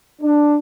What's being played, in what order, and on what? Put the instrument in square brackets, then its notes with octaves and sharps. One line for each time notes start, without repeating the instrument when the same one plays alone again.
[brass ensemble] D4